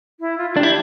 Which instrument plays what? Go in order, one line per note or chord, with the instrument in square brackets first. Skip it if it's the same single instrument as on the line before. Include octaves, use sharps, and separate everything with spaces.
[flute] E4
F4
F4
[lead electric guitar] D4 [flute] G4
[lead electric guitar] E4